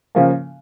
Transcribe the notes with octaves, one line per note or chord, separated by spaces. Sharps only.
C#3 F3 A#3